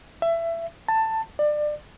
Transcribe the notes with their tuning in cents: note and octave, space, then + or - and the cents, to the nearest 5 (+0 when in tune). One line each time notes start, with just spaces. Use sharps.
E5 +20
A5 +15
D5 +25